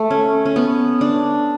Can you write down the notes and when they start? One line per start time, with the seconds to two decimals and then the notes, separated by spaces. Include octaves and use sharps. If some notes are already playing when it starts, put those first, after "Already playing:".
Already playing: A3
0.10 C#4
0.45 C#4
0.56 B3
1.01 D4